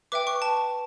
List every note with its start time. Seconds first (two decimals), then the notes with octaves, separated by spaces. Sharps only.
0.12 B4 E5 G5 D6
0.27 C#6
0.42 A5